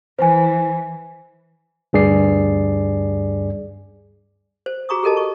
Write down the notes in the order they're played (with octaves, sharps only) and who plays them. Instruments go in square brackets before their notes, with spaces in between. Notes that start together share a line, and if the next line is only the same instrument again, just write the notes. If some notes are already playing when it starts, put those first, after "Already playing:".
[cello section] E3 [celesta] C5 G#5
[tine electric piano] D2 G2 G#4 D5 C7
[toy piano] C5
F#4 G#4 A#5 C#6 D#6
G4 A4 A#4 D#5 A5
C#6